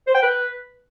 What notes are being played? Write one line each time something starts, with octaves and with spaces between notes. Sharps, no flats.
C5
G5
B4